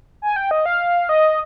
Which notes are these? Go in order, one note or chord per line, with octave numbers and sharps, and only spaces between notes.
G#5
G5
D#5
F5
D#5